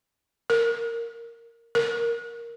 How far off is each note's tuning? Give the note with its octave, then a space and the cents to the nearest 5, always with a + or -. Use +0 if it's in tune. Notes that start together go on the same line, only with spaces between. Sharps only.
A#4 -10
A#4 +0